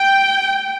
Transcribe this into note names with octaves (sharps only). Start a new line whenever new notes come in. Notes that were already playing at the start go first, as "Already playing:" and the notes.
Already playing: G5